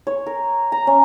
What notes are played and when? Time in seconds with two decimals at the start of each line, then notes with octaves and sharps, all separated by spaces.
0.07 C#5
0.26 A#4
0.72 A#5
0.87 C#4